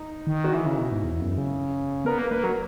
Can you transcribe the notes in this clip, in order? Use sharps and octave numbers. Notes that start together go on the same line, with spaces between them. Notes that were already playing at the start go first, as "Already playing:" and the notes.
Already playing: D#4
D#3
F#4
E3 E4
C#3
B2
G#2
E2
F#2
C#3
B3 A#4
A#3 B4
A#3 B4
F#3 A#4